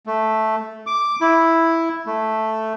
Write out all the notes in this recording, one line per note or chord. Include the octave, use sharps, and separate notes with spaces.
A3
D6
E4
A3